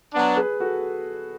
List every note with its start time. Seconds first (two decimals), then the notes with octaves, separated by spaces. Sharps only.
0.13 F#3 B3 D4
0.36 G#4 B4
0.60 F#4 A4